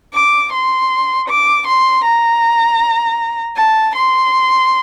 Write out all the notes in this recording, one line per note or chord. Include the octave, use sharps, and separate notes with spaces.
D6
C6
D6
C6
A#5
A5
C6